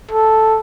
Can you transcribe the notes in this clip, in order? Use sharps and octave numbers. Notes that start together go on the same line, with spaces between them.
A4